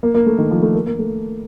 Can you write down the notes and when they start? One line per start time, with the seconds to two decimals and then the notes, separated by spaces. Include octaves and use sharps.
0.03 A#3
0.15 A#3
0.26 A3
0.38 D#3
0.51 F3
0.62 A3
0.75 A#3
0.86 A#3
0.99 A3